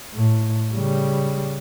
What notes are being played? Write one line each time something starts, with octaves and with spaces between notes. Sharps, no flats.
A2
C#3 G3